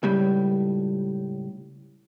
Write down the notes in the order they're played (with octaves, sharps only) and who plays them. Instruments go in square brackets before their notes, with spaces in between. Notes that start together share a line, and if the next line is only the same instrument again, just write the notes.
[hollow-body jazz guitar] C#2 A2 G3